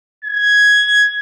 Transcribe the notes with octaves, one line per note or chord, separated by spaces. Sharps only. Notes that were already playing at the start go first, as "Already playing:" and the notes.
G#6